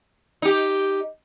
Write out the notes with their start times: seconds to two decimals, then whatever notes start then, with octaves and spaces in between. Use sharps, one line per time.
0.42 D#4 G4